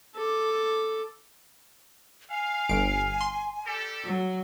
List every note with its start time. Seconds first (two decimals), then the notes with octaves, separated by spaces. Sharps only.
0.15 A4 D6
2.30 F5 G#5
2.69 G1 D7
3.21 C6
3.65 G3 G4 A4
4.04 F#3